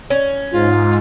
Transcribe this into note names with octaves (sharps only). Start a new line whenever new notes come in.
C#4
G#2 F4